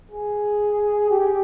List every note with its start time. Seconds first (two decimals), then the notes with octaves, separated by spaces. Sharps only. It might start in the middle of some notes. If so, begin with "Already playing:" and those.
0.11 G#4
1.10 G4